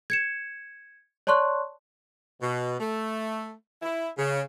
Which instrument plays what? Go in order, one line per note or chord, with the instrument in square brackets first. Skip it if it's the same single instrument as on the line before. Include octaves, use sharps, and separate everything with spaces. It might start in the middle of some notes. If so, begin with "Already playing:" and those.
[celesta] G#6 C#7 E7
C#5 D5 A5 C6 C#6 F#6
[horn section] B2
A3
E4
C#3